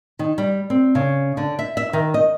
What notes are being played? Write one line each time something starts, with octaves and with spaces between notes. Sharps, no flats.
D#3
G3
C4
C#3
D3
E5
E5
D#3
D#5